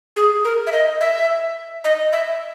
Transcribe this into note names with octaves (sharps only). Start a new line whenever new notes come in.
G#4
A#4
E5
D#5
E5
D#5
E5